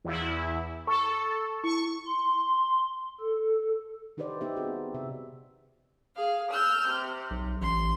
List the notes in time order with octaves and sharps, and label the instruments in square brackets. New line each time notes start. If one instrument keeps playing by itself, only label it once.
[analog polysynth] E2 E4
[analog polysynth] A4 [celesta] C#6
[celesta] E4 [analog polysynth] C#6
[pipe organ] C6
A4
[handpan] D#3 D#4 G4 B4 C5 D5
B3 D#4 G4 E5
C4 F#4 G#4
C3 E5
[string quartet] G#4 F5
E6 F6 G6
C3
[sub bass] B1
[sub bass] A1 [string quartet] C6